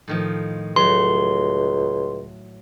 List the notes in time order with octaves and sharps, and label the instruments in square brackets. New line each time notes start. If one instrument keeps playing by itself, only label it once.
[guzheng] A2 D#3 F3
[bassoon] C#2 [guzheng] F#3 A3 [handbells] C6